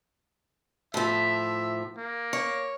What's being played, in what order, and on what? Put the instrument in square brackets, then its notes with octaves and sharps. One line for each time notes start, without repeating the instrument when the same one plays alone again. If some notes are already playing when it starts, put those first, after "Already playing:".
[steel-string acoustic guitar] A2 F3 [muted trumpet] E5
[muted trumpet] A#3
[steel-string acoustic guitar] C#5